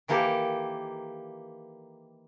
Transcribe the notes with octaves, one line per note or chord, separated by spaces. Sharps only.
D#3 E3 A#3 G4 A4